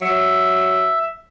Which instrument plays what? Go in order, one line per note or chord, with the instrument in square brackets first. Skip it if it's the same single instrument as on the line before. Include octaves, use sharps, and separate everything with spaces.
[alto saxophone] F#3 [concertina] E5